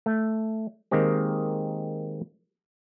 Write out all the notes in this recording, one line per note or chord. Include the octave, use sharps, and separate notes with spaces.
A3
D#3 G#3 A#3 C4 G4